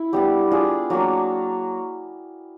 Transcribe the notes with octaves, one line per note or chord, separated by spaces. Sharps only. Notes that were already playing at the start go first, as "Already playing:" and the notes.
Already playing: E4
G3 B3 D4 G4
D4 F4 G#4
F#3 A#3 D4